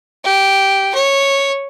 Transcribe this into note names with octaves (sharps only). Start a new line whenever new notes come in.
G4
C#5